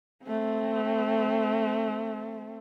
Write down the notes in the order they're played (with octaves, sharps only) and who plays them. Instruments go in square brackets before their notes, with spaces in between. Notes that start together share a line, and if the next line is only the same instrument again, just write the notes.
[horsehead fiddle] A3 C4